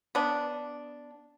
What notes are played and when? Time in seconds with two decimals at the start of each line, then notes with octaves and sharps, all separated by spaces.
0.15 B3 D4